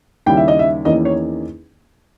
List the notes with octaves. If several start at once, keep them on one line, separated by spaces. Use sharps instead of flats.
D#2 C#3 G3 C#4 E4 G5
E5
D#5
E5
E2 D#3 A#3 C#4 E4 D#5
C#5